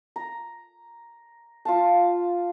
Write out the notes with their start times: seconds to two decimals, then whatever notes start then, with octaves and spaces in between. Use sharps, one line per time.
0.16 A#5
1.65 F4 F5 A5